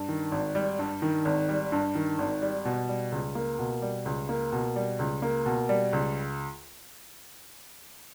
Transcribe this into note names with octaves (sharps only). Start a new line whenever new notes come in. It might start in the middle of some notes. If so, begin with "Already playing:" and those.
Already playing: G2
D#3
G#1
G3
G2
D#3
G#1
G3
G2
D#3
G#1
G3
B2
G3
C#2
A#3
B2
G3
C#2
A#3
B2
G3
C#2
A#3
B2
G3
C#2